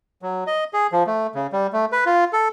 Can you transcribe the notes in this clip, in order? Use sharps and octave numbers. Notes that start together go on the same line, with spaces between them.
F#3
D#5
G#4
F3
A3
C#3
G3
A3
B4
F4
A4